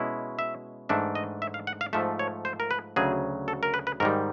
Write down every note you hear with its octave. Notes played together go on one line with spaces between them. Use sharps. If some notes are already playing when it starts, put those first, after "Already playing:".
Already playing: B2 G#3 C#4 E4
E5
G#2 E3 A3 D4 E5
D#5
E5
F5
F#5
F5
G#2 F3 A3 E5
C#5
C5
A#4
B4
D2 C#3 F#3 G#4
A4
A#4
B4
B4
G#2 D#3 G3 A#4